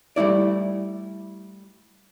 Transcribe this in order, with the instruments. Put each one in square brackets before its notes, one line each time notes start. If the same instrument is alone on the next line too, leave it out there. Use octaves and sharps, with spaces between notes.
[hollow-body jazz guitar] G3 A3 E4 D5